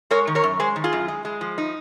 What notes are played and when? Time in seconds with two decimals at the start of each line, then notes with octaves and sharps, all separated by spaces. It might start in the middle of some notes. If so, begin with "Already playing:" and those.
0.11 G#3 A#4 C#5
0.27 D#3
0.35 A#4 C#5
0.44 F#2
0.60 G#3 G#4 C5
0.76 D#3
0.84 F4 G#4
0.93 F#2
1.08 G#3
1.25 G#3
1.41 F3
1.58 D#4